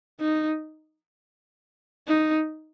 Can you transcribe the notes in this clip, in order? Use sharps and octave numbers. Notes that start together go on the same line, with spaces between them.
D#4
D#4